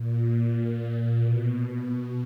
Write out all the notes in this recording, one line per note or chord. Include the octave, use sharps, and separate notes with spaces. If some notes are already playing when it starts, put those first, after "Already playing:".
Already playing: A#2
B2
B2